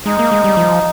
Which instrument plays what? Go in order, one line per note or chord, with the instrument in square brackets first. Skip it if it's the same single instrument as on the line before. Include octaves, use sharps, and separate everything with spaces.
[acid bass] G#3 [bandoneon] D#4
[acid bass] A#3
G#3
G3
F3